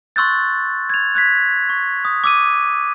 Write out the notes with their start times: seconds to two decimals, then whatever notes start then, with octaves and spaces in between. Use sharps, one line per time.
0.16 C6 C#6 E6 F#6 G6 A6
0.90 G#6 F7
1.15 F#6 G#6 B6
1.69 C#6
2.05 D#6
2.24 D6 E6 D#7